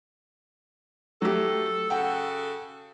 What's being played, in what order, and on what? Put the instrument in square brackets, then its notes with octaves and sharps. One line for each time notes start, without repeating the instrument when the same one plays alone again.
[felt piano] F#3 A3 G4 [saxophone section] A4
[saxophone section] C#3 F#4 A4 [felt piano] F#5 G5